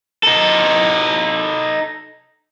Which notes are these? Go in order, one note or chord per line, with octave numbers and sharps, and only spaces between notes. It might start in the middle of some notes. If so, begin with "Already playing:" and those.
D#4 A4